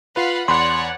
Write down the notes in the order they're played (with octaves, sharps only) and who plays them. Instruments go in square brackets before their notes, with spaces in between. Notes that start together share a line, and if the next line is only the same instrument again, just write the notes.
[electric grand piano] F4 B4 [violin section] F5 F#5 B5
[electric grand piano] E2 B5 F#6 [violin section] C#5 D5 F#5 [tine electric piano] C6